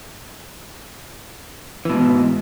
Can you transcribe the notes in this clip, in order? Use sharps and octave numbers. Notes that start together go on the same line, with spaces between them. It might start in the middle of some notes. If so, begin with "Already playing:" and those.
G#2 B2 E3